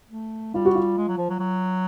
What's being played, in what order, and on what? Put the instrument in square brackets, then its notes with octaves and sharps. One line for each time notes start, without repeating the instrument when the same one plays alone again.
[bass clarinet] A3
[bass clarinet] G3 [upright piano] F4
[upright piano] F#4
F4
[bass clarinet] G#3
F#3
F3
F#3
F#3